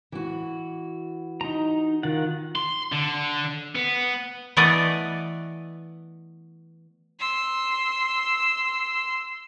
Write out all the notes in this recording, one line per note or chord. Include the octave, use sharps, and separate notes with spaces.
E3 F#4
D#4 A#5
D#3 F4 F#5
C6
D3
B3
E3 A3 B3 D5 D#5
C6 E6